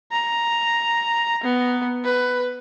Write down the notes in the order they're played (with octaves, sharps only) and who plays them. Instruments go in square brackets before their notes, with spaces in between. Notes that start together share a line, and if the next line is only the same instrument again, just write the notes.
[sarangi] A#5
B3
B4